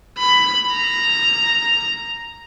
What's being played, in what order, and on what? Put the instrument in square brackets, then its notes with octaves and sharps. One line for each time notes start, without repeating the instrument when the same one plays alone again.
[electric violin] B5
A#5